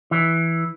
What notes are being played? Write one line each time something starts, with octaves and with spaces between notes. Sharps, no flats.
E3